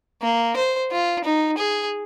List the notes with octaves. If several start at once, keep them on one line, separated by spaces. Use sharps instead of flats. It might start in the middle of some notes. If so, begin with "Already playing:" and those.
A#3
C5
F4
D#4
G#4